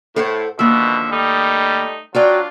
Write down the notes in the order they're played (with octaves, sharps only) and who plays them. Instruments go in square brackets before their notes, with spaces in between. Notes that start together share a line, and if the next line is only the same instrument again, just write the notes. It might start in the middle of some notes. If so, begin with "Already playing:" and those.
[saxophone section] A2 [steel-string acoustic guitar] A4 C5 F#5
[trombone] B2 [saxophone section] D3 F3 E5 [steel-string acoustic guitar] D#3 A#3
[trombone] G3 [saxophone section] A3 D#4
[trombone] F#3 [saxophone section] D4 F4 [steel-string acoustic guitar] F#4 D5 G5